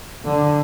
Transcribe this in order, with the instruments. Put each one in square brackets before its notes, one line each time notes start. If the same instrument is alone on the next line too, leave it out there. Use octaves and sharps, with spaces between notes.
[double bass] D3